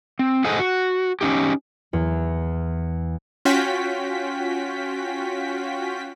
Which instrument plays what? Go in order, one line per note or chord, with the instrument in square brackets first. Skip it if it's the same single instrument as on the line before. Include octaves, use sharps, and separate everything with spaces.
[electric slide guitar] C4
G#4 A4 C5 D#5 F#5 G#5
F#4
C#4 D#4 G4
[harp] E2
[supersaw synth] C#4 F4 F#4 G5 B6